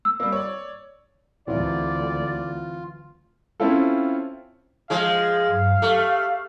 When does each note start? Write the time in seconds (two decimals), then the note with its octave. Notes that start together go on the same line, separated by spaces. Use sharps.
0.05 E6
0.20 G3 A#3
0.32 C#5 D5
1.48 D2 E3 F#3 C4 F4 D5
3.60 C4 C#4 E4 F4 A4
4.90 F3 G#3 F5
5.48 G2 F#3
5.82 A3 G4